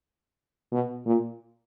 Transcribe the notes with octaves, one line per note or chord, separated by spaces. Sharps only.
B2
A#2